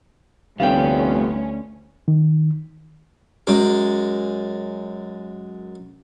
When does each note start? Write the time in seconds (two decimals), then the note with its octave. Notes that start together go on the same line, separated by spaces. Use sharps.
0.60 F1 D2 G3 B3 C#4 F5 G5
2.08 D#3
3.47 F#2 G#3 D6